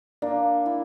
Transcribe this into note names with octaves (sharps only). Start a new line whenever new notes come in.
A#3 D4
E4